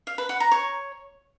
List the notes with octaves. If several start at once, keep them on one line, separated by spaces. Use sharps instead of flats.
F5
B4
F#5
A#5
C#5